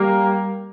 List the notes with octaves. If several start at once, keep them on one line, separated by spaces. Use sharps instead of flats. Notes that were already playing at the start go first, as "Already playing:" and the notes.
Already playing: G3 A#3